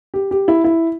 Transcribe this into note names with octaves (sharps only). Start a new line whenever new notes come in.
G4
G4
E4
E4